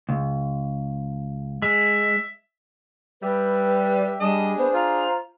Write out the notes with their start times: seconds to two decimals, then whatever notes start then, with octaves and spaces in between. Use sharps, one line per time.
0.09 C#2
1.62 G#3 E5
3.22 G3 G4 B4 E5
4.20 G3 D4 G#4 D#5 A5
4.58 B3 C5
4.74 F4 C5 A#5